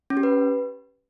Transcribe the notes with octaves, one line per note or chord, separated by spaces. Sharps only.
C#4
G4
B4